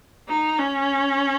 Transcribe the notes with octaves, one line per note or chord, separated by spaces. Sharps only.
D#4
C#4